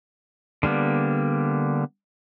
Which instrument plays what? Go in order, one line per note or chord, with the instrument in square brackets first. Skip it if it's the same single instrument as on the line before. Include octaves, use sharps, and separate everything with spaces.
[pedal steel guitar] D3 G3 A#3 B3